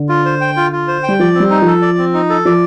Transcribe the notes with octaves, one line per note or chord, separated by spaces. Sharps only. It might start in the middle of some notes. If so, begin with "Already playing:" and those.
Already playing: D3
F4
C5
G5
F4
F4
C5
G5
G3
F3 D5
C4
G3
D#4
F3
A4
D5
C4
D#4
A4
F3 D5